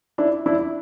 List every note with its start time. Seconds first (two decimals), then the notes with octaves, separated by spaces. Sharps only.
0.18 D4 E4
0.46 D4 E4